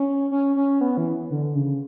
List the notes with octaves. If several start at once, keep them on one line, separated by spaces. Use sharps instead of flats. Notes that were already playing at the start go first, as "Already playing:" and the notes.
Already playing: C#4
C#4
C#4
B3
E3
D3
C#3